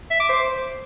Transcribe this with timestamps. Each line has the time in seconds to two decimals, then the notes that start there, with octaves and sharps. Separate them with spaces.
0.11 E5
0.20 D6
0.29 C5